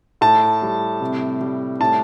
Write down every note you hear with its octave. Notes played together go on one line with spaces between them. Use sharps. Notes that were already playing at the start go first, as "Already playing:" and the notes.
A2 A5
G3
C3
G3
A2 A5